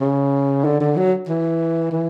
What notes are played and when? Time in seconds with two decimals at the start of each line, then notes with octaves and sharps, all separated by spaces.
0.01 C#3
0.64 D3
0.80 D3
0.96 F#3
1.28 E3
1.91 E3